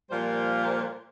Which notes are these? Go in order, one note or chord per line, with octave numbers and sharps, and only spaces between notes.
A#2 F3 G3 F4 A#4 C5